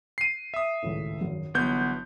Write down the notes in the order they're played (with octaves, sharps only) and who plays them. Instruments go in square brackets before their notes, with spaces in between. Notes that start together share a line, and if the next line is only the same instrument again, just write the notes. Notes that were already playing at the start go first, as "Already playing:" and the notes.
[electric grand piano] C7 D#7
E5 D#6
[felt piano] G#1 C#2 A2
G#1 F#2
[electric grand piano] G1 B3 G6 [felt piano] E3 F#3